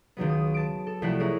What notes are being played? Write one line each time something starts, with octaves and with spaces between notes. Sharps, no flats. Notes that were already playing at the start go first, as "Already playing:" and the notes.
C#2 D#3 F#3 B3
D#6
A5 D7
A4
C2 F3 A3 E4 A4 F#5
C#4 E4 G#4 A#4